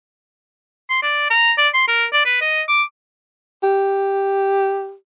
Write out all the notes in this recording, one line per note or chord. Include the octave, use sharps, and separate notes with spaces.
C6
D5
A#5
D5
C6
A#4
D5
B4
D#5
D6
G4